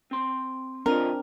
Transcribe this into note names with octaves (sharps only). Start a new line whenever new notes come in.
C4 C6
E3 C4 D4 F4 A#4 D#5